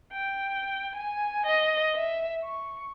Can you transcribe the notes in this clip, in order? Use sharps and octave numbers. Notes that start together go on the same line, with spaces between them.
G5
G#5
D#5
E5
C#6